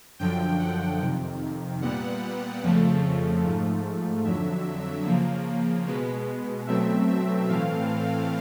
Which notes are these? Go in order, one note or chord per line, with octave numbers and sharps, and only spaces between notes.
F#2 D3 F3 G5
F#5
F2 C3 D#3
A#2 G3 B3 F#5
F2 C#3 F3 A3
G#2 F3 A3
F2 D3 F#3 E5
C#3 F3 A#3
B2 G#3 B3
B2 F#3 A3 C4 E5
E5
A2 E3 A3 C4 F5